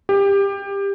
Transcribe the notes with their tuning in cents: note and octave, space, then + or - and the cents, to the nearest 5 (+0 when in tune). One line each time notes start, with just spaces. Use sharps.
G4 +20